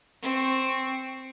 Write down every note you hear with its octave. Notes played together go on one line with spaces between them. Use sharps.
C4 C#6